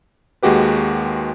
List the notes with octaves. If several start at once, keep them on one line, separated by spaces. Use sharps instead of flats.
D#2 G#3 F#4 G4 B4